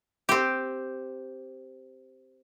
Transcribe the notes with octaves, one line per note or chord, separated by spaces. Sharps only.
C4 G4